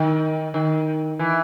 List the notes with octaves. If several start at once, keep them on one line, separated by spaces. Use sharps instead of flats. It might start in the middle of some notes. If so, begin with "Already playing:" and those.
Already playing: D#3
D#3
E3